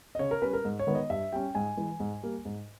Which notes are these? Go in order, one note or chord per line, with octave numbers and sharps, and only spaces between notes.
D#5
C#3 C#5
A#4
G3 C#4 B4
A#4
G#2
C#5
D#3 G#3 B3
D#5
G2 E5
G3 C#4 G5
G#2 G#5
E3 G#3
G#2
G3 A#3
G#2